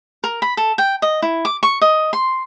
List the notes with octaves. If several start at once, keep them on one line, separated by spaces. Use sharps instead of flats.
A#4
B5
A4
G5
D#5
E4
D6
C#6
D#5
C6